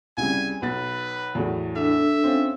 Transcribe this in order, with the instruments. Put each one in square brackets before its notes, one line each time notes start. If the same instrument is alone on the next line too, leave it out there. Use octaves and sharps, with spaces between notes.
[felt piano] C2 C#3 G3 [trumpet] G#5
[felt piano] B1 A6 [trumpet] B4
[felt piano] E2 A2 F#3
[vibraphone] D4 A4 [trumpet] E5
[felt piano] C4 C#4 F4